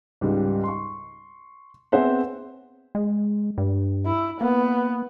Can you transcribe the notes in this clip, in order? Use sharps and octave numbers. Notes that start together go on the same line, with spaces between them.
C#2 G#2 G3
C6 C#6
B3 C4 G#4 C5 E5 F#5
G#3
G2
E4
A#3 B3